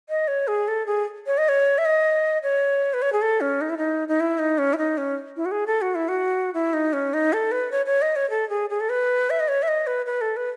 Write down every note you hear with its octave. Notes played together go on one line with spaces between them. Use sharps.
D#5
C#5
G#4
A4
G#4
C#5
D#5
C#5
E5
D#5
C#5
B4
C#5
G#4
A4
C#4
D#4
E4
D#4
D#4
E4
D#4
C#4
E4
D#4
C#4
E4
F#4
G#4
A4
F#4
E4
F#4
E4
D#4
C#4
D#4
A4
B4
C#5
C#5
D#5
C#5
A4
G#4
G#4
A4
B4
E5
D#5
C#5
E5
D#5
B4
B4
A4
B4